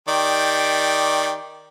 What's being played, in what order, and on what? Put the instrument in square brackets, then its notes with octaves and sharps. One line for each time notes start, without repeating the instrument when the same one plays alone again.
[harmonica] D#3 G4 D5